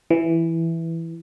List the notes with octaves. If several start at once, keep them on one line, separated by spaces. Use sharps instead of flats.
E3